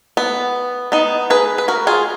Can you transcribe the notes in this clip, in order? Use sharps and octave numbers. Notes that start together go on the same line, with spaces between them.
B3
B3 D#4
G#4 B4
B4
F#4 A#4
F4 G#4